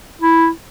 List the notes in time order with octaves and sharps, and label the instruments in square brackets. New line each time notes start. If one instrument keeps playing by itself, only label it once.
[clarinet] E4